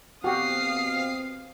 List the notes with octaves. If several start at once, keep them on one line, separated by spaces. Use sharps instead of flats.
B2 C4 F#4 G4 F5 D#6 C7